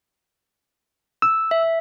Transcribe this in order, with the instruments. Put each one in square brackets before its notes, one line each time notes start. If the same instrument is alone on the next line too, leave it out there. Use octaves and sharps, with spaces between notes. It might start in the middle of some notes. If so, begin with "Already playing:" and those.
[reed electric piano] E6
[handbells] E5